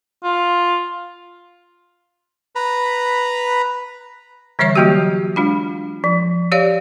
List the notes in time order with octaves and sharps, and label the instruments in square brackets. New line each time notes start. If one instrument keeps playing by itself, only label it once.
[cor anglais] F4
[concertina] B4 A#5 B5
[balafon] D3 E3 G3 C#5 E5 C#6
F#3 G3 A#3 F#4 G4
G#3 D4 F4
F3
G4 C#5 D5 F5